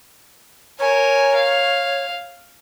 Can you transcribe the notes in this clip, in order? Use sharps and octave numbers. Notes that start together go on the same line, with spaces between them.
A#4 C#5 G#5
F5